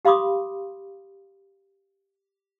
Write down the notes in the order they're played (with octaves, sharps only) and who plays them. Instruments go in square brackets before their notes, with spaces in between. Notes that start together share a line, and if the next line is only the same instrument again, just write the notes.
[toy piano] G4 F5 B5 C6 D6 D#6